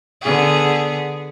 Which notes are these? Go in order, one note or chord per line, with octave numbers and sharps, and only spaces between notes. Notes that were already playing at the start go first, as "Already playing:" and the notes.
D3 B3 G#4